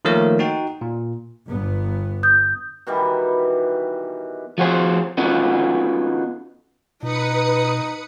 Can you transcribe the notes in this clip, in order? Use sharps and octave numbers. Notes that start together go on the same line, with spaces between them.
D#3 F3 A3 A#3 A#4 C#5
D#4 F#4 G5
A#2
G1 G2 B3
D#6 G6
B2 D#3 E3 G3
F3 F#4 G#4 C5
B3 C#4 D#4 F4 F#4
B2 D#4 B4 D#6 C#7